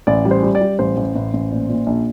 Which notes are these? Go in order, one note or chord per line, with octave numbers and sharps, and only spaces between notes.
A1 D5
G3
C5
G3
D5
G3
A1 C5
A1
A1
A1
A#2
A#2
A#1